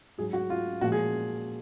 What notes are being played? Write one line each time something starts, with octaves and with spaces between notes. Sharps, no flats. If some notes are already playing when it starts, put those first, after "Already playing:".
G#2 F#3 G#4
F#4
F4
A#2 F3 G#3 F#4
G#4